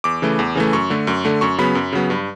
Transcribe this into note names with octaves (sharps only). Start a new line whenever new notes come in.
E2 D6
C#3 E3 A3
E2
C#3 E3 A3
F#2 C#6
D3 A3
F#2
D3 A3
F#2 C#6
C#3 F#3 B3 B5
F#2
C#3 F#3 B3
G2